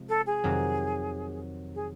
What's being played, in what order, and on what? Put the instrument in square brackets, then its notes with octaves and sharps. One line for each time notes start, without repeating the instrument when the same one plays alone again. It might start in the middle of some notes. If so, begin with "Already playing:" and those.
Already playing: [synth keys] C3 F3 G#3
[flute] A4
G#4
[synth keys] F2 C3 D#3 F#3
[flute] G#4